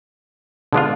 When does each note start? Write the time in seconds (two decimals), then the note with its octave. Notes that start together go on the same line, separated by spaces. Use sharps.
0.73 D3 G#3 B3 D4 F4